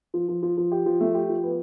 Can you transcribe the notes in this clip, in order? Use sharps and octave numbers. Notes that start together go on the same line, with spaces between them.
F3
F3
F3
F3
G4
F3
A3
G4
F3
B3